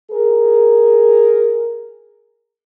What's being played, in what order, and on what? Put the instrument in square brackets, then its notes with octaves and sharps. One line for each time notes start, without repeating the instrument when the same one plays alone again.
[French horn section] G#4 A#4